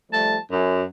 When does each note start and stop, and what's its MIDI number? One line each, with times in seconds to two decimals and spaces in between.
0.11 0.36 53
0.11 0.36 55
0.11 0.36 57
0.11 0.36 81
0.50 0.81 42